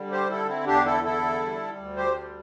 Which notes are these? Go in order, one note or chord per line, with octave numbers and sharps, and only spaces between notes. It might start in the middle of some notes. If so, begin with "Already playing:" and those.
Already playing: D3 G3
G4 C5
D3 E4 A4
C4 E4
E2 D4 G4
E4 A4
D3 E4 A4
G3
D2
G4 C5
G3